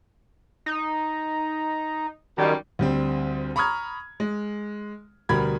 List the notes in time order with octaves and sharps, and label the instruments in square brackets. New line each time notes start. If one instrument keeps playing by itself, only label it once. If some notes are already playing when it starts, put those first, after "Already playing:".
[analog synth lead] D#4
[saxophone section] F#2 G3 [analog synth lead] D#3
[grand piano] D2 G3 C4
A#5 B5 C#6 D#6 F6 G#6
G#3
D2 B2 G3 A#4 B5 G#6